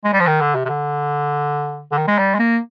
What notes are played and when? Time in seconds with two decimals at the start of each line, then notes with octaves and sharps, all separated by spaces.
0.04 G#3
0.13 G3
0.20 F3
0.27 D#3
0.41 D3
0.55 C3
0.65 C3
0.69 D3
1.91 D3
1.97 D#3
2.08 G#3
2.18 G3
2.34 G#3
2.39 A#3